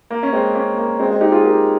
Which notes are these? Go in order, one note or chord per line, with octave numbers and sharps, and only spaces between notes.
A#3
C#4
G#3 C4
A#3 C#4
A#3
G#3 C4
G#3 C4
D#4 G4
F4 G#4
G4 A#4